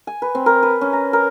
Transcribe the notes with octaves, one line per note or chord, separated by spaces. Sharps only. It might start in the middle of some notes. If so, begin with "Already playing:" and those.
G#5
B4
C4
A#4
B4
C#4
A#5
A#4